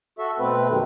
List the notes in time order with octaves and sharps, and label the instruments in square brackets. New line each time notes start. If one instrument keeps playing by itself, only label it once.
[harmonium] F#4 A4 E5
B2 A3 C4 B4
F#2 C3 D#3 A3